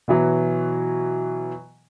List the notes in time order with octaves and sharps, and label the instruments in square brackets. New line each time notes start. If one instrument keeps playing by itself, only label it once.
[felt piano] B2 E3 F#3